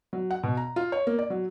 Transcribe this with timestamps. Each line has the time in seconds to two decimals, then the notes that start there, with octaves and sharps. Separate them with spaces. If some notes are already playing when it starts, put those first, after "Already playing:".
0.13 F#3
0.30 F#5
0.43 B2
0.57 A#5
0.76 F4
0.92 C#5
1.07 A#3
1.19 D5
1.30 F#3